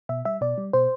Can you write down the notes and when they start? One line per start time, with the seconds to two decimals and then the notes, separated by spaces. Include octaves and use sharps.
0.09 B2 E5
0.25 G3 E5
0.41 B2 D5
0.58 G3
0.73 B2 C5